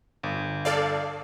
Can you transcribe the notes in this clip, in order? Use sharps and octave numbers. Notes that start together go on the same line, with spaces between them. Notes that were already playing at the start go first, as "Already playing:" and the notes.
G1
A4 D5 F5